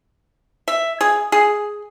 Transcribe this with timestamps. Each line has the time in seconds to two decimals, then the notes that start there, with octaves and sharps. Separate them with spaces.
0.68 E5
1.01 G#4
1.32 G#4